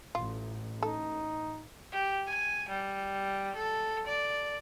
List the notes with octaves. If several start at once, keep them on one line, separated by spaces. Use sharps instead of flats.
A1 F4
D#4 A4
G4
G#5
G3
A4
D5